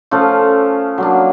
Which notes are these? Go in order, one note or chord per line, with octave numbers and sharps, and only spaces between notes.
F3 A3 C#4 F4
F#3 A#3 D4